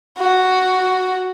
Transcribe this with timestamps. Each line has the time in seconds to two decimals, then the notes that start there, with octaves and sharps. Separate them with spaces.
0.18 F#4